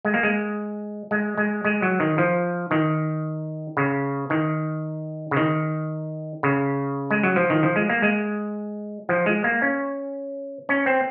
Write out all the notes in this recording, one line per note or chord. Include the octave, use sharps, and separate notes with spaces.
G#3
A#3
G#3
G#3
G#3
G#3
F#3
D#3
F3
D#3
C#3
D#3
C#3
D#3
C#3
G#3
F#3
F3
D#3
F3
G#3
A#3
G#3
F3
G#3
A#3
C#4
C#4
C4